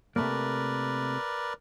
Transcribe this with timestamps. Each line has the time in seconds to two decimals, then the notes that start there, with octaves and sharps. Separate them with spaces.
0.16 C3 A3 A#3 A#4 B4 D5